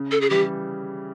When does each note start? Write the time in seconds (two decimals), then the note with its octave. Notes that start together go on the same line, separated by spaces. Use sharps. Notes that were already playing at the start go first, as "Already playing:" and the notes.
Already playing: C#3
0.11 A4
0.21 G#4
0.30 E3 G3 G4